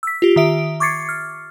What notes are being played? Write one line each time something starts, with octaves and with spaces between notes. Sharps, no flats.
E6 B6
F4 G4
D#3 E5 D7
C#6 D6 G#6 A6 C7 C#7
F6